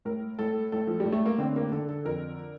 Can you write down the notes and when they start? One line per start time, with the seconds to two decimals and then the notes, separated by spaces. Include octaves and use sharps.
0.05 A2 A#4
0.39 A2 A4
0.72 A2 A4
0.87 F3
1.00 G3
1.06 A2
1.12 A3
1.26 A#3
1.38 D3 C4
1.56 A#3
1.72 D3 A4
1.89 A4
2.05 F2 A#4